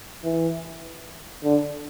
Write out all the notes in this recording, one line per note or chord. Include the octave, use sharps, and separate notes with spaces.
E3
D3